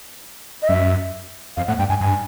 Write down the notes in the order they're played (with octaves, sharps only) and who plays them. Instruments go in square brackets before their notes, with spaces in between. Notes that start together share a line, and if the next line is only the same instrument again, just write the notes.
[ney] D#5
[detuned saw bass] F#2 [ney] E5
[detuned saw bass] F2 [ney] F5
[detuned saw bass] A2 [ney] F#5
[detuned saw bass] G2 [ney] G5
[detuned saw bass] G2 [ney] G#5
[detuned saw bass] G2 [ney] G#5